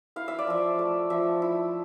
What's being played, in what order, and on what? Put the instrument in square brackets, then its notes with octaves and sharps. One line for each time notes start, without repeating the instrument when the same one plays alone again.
[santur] E4 F5
E5
D5
F3 E5
A3
F3 E5
E4